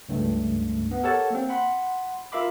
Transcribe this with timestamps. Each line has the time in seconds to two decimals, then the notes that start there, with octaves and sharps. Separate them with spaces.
0.09 C#2 G2 A3
0.91 B3
1.03 G4 A4 A#4 C#5 F#5 A5
1.30 A#3 C4
1.49 F#5 B5 C6
2.32 F4 A#4 E5 F5 B5 D6